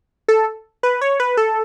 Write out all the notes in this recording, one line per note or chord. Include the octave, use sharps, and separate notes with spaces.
A4
B4
C#5
B4
A4